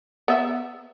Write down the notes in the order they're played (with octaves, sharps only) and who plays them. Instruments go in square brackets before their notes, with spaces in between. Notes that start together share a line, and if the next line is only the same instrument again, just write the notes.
[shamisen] B3 E5